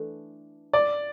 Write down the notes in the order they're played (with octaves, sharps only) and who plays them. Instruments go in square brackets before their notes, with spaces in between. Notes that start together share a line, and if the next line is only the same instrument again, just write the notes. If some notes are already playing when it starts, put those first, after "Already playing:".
Already playing: [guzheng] E3 A3 D4
[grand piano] D5